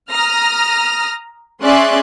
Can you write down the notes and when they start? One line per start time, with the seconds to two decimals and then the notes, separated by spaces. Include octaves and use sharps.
0.11 A#5 D#6 F6 A#6
1.63 C#4 G#4 D5 E5 C6 F#6